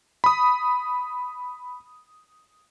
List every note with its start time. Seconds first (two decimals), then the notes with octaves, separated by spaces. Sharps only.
0.24 B5 D#6